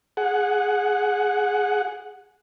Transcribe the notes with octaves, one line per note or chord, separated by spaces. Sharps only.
G#4 F#5